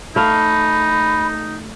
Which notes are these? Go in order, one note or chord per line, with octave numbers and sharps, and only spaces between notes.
A3 D#4 F5 B5